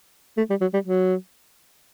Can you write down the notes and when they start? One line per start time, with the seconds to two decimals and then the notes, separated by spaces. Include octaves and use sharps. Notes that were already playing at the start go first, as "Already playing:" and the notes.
0.37 A3
0.50 G3
0.61 F#3
0.73 G3
0.85 F#3